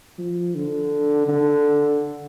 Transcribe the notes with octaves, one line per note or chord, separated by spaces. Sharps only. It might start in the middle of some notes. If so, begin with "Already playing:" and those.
F3
D3
D3